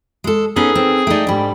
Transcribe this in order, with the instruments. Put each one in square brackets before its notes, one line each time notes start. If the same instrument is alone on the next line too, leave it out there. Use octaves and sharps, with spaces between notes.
[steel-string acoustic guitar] G#3 A4
[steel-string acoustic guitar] B3 C#4 [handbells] D#4 A4 B4 [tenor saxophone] G#4
[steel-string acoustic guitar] C4
[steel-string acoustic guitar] A3 D#4 [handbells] D5 G5
[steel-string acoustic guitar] G#2 G3 [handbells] D4 B5